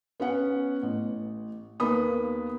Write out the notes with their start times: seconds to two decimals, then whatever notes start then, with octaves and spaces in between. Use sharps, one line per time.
0.20 B3 C#4 F#5
0.83 A1
1.80 D#2 A#3 B3 B5 D#6